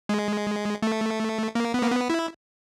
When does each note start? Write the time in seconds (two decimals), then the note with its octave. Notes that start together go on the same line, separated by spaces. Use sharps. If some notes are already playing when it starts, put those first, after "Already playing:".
0.09 G#3
0.82 A3
1.55 A#3
1.74 B3
1.83 A#3
1.91 B3
2.10 E4